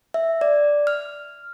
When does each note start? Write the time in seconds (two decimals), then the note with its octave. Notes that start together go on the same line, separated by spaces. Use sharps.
0.14 E5
0.41 D5
0.87 F6